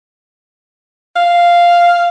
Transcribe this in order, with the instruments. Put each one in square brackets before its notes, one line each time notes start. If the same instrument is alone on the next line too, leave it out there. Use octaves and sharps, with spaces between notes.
[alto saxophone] F5